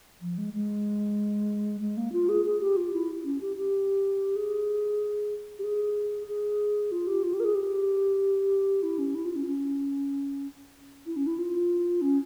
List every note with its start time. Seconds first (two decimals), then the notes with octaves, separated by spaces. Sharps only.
0.22 F3
0.38 G#3
0.54 G#3
1.81 G#3
1.97 A#3
2.13 F4
2.29 G#4
2.45 G#4
2.61 G4
2.77 F4
2.93 E4
3.25 C#4
3.41 G4
3.57 G4
4.36 G#4
5.59 G4
5.64 G#4
6.27 G#4
6.92 F4
7.08 G4
7.23 F4
7.34 G4
7.40 A#4
7.45 G#4
7.55 G4
8.83 E4
8.99 C#4
9.15 E4
9.25 F4
9.36 C#4
9.46 C#4
11.06 E4
11.16 C#4
11.27 E4
11.38 F4
12.02 C#4